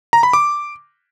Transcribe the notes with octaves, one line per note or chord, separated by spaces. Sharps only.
A#5
B5
D6